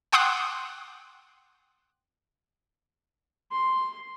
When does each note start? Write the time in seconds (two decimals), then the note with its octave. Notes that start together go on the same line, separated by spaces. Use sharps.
0.12 F#5 G5 C6 D6 D#6 F#6
3.52 C6